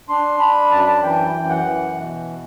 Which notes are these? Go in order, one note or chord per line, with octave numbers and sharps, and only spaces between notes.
D4 C6
D4 B5
F#2 A5
B5
A5
E3 G5
F#2
F#5
E3
B2